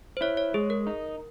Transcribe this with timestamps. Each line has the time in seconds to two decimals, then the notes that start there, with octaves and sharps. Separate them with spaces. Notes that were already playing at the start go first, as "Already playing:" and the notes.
0.17 C5
0.21 E4 C#5
0.37 C#5
0.54 G#3 G#4
0.70 A#4
0.87 D#4